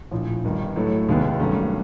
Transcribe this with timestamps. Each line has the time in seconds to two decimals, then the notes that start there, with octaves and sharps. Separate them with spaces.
0.11 A#1 A2 F3
0.43 G1 G2 D#3
0.76 A2 F#3 A3
1.08 F1 D#2 D#3 G#3 B3
1.40 G2 D#3 F#3 A3 C#4